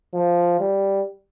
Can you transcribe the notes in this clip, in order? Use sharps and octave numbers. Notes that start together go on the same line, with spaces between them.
F3
G3